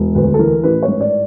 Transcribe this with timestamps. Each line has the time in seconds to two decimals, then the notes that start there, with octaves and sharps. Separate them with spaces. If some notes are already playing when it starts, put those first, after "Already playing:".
Already playing: E1
0.15 D2 B4
0.34 A4
0.39 E3 A#4
0.63 A1 B4
0.83 C#5
0.88 G#2
1.01 D5